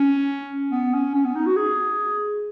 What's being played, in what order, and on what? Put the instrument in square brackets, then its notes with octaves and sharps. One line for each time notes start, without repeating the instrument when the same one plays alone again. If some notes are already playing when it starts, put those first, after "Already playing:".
Already playing: [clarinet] C#4
B3
C#4
C#4
B3
D#4
F#4
G#4